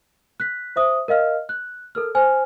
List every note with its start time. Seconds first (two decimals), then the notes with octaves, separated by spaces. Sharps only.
0.40 F#6 B6
0.76 C5 E5 D#6
1.08 A#4 D#5 F5 F6
1.49 F#6
1.95 A4 A#4 F6
2.15 C5 G#5 F6